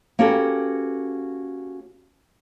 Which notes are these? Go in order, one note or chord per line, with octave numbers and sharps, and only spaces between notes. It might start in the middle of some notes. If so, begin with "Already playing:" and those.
A#3 C#4 F#4 G4 A4 B4